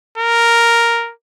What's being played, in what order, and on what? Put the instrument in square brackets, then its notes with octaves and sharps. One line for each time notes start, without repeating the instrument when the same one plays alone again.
[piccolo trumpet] A#4